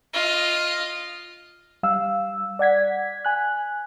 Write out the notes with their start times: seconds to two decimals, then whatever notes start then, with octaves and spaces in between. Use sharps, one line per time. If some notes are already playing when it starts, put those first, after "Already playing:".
0.14 F4 D#5
1.83 G3 F5 E6
2.59 D5 F#5 G#6 B6
3.25 G#5 F#6